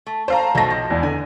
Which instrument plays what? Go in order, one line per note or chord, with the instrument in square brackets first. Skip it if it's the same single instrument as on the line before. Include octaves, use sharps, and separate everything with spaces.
[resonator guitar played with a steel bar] A3
[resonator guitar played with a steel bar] A3 [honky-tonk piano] C5 F5 A#5
[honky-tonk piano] B1 A#6 [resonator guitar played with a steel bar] B2 A3
[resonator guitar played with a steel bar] F3
[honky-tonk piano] E2
[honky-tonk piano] D3 [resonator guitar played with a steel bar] G#5